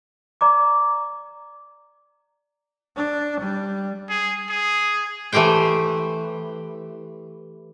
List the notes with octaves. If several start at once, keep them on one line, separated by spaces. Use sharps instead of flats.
D5 A#5 D6
D4
G3
G#4
G#4
E3 A3 G4 C5 G5